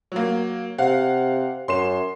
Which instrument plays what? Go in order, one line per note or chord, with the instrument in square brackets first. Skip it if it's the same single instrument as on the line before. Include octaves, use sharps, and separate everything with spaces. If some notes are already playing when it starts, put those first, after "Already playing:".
[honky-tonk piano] F#3 A#3
[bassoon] C3 [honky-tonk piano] F5 F#5
[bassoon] F#2 [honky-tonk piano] C6 C7 E7